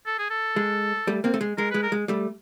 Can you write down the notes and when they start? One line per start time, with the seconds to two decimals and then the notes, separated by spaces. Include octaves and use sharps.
0.06 A4
0.19 G#4
0.30 A4
0.56 G#3
1.07 G3 A3
1.24 A#3 C4
1.34 A3
1.41 G#3
1.58 G#3 A#4
1.71 G#3 B4
1.83 A#4
1.92 G#3
2.08 G3 A3